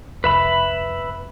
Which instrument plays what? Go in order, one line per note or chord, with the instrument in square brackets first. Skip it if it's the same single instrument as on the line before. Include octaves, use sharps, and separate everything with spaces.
[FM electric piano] C2 F2 [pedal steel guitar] B4 E5 B5